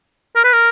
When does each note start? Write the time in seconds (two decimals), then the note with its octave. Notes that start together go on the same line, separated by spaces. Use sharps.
0.36 A#4
0.44 B4
0.53 A#4